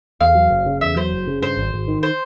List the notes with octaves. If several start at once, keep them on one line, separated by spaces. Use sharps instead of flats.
E2 F5
F#3
F#1
C#3
E2 E5
F#3 C5
F#1
C#3
G2 C5
G#1
G#1
D#3
C5